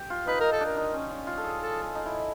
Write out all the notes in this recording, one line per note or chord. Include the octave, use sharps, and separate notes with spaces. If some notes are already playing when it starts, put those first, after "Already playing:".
Already playing: G4
F4
D#4 B4
D#4 A#4
A4
D4
A#4
D#4
C#4
C#4
F4
A4
G#4
A4
A4
D#4
E4